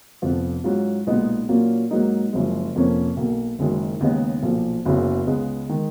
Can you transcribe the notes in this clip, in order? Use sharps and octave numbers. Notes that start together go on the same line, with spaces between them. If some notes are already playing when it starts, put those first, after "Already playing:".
F1 F2 F3 B3 F4
G#2 F#3 C#4 F4
B1 A#2 G#3 B3 D#4
A#2 F#3 A#3 C#4 F4
G#2 F#3 A#3 D#4
F#1 F#2 F3 G#3
F1 F2 F3 A#3 C#4
B1 B2 A#3
F#1 F#2 D#3 G#3
D#2 C#3 G#3 B3 D#4
B1 A#2 F3
F#1 F#2 C#3 F#3 B3
C#2 C#3 G#3 B3
D#3 G#3